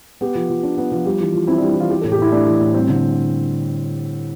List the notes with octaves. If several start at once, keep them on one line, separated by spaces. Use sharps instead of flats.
B3 G4
F3
F3
D4
B3
F3
G3 G4
E3
F4
C4 E4
D4
G3
E4
E3 F4
E3 G4
A4
A2
G4
A2 E4
A3 D4
E3
A2
G3 C4
D3